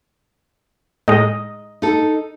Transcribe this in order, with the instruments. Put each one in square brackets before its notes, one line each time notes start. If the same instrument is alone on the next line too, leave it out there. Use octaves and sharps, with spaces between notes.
[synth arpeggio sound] A2 G#3 [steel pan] D#5
[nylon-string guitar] D#4 A4